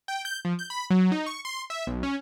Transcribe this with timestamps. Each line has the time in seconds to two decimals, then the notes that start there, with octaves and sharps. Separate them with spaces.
0.08 G5
0.25 G6
0.45 F3
0.59 G6
0.70 B5
0.90 F#3
1.12 D#4
1.26 C#6
1.45 C6
1.70 E5
1.87 B1
2.03 C#4